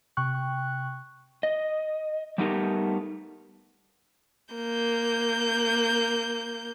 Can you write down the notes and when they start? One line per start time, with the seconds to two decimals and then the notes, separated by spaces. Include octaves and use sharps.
0.17 C3 G5 C#6 F#6
1.43 D#5
2.38 G3 A3 B3 D#4 G4 A#4
4.54 A#3 G6